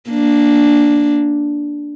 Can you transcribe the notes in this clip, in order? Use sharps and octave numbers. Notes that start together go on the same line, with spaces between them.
A#3 D4